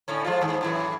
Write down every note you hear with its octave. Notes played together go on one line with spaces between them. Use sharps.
A2 D3 C#4
F3 G#3 F4
D#2 G#2
F#2 A2 E3